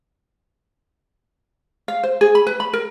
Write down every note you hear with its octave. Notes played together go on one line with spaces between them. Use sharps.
F5
C5
G#4
B5
B4
B5
A#4